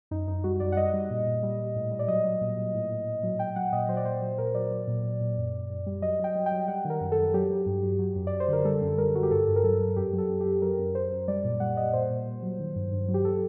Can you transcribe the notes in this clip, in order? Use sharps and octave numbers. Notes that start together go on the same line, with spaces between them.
F#2 D#4
F#2 D#4
G3 F#4
F#2 D5
F#5
G3 D#5
G3
A#2
A#2
G3
G3
A2
G3
D5
F#3 D#5
F#3
A#2
A#2
A2
A2
A2
F#3
F#3 G5
F#3 F#5
A#2 D#5
F#3 C5
D5
A#2 C5
F#3
A#2 A#4
F#3 D5
F#3
A#2
A#2
A#2
F#2
F#2
F#2
G3
F#3 D#5
F#3 G5
F#3
G5
F#3
G3 F#5
D#3 A#4
F#2
A4
F#2
F#3 G4
F#3
G2
F#3
F#3
F#2
D5
F#2
C5
D3 A#4
G3 A4
F#2
G3 A#4
F#2 F#4
G4
G2 A4
G2
A#4
F#3 A4
F#3
F#2 G4
F#3
A4
F#2
F#2 G4
F#3 A#4
F#2
F#3 C5
F#2
G3 D5
A#2
G3 F#5
G3 D#5
A#2 C5
A#2
A#2
F#3
D#3
G2
G2
F#3
G4
A4